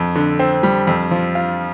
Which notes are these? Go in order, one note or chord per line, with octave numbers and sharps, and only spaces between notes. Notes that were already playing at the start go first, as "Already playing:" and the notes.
Already playing: F2
D3
C4
G3
F2
F3
F4